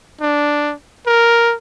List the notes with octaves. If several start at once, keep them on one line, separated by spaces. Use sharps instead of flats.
D4
A#4